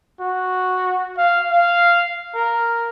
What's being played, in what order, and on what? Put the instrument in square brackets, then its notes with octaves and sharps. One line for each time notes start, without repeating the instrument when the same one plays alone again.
[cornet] F#4
F5
F5
A#4